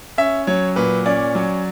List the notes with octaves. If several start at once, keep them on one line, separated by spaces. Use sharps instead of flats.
C#4 E5
F#3 C#5
A#2 B4
C#4 D5
F#3